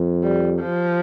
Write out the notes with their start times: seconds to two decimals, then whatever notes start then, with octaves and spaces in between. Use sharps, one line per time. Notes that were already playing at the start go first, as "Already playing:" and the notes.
Already playing: F2
0.24 G3
0.59 F3